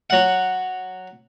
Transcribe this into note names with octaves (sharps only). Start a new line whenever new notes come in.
F#3 F#5